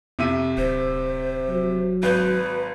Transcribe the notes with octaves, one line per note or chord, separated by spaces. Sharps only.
F2 C3 E5 D#7
D1 C5
F#3
G#1 B4 G6